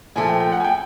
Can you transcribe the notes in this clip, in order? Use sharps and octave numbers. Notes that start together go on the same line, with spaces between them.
A#2 F3 A3 G#5
G5
G5
F#5
G#5
G5